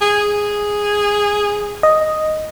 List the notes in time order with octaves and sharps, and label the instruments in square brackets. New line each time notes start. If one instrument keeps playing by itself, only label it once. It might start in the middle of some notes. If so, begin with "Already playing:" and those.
[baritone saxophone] G#4
[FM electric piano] D#5